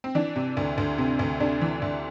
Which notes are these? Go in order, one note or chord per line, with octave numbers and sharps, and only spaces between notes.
C4
E3 D4
C3
D2
D2
C3
D2
C3 D4
E3
D2